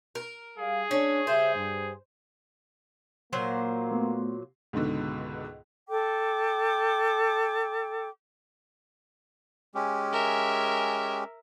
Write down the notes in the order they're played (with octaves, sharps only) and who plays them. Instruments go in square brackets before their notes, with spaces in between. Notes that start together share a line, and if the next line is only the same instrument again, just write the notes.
[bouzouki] A#4
[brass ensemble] G3 F5 [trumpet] G#4
[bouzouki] C#4 [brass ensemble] D4
[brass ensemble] C#3 G3 E5 [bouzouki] C5
[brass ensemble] G2
[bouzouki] A#2 F#3 C5 [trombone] A#3
[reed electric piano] A3 B3
[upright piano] C#2 G#2 B2 D3
[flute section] A4 G5 D6
[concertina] G#3 C#4 G4
[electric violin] A#4 E5